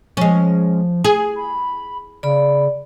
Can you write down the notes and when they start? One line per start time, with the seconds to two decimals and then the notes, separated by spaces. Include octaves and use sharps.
0.17 F3 G#3 C#4
1.04 G#4
1.36 B5
2.23 C#3 D5 B5